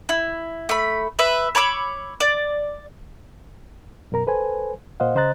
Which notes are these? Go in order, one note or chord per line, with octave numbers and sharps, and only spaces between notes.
E4
A3 B5
B4 E5
C#5 B5 D6 E6
D5
F#2 B2 A#4 A#5
A4 B4 C5 G#5
A#2 C5 D#5 F5 F#5
C#3 C5 D#5 A#5 F#6 A6